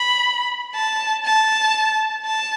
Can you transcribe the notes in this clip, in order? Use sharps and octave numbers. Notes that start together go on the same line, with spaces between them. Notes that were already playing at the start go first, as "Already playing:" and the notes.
Already playing: B5
A5
A5
A5